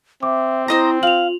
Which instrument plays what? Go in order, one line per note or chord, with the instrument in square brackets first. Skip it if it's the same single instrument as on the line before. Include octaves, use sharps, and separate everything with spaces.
[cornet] C4 [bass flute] E5 [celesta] D6
[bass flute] E4 [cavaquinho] C5 D#5 A#5
[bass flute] F4 [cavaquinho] F5 [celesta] F7 F#7